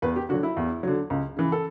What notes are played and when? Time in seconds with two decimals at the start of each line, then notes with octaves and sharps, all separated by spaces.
0.02 E2 B4
0.16 G4
0.29 D3 F#4
0.34 F#3
0.43 E4
0.57 E2
0.83 D3 F#3
1.10 C#2
1.37 C#3 E3
1.52 A4